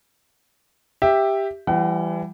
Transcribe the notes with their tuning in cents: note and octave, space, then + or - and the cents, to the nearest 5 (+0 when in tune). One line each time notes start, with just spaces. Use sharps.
G4 +5 E5 +0
E3 +30 G3 +0 F#5 +40